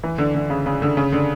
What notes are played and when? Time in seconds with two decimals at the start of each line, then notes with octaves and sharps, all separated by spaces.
0.03 E3
0.18 D3
0.35 D3
0.50 C#3
0.66 C#3
0.82 D3
0.97 C#3
1.13 D3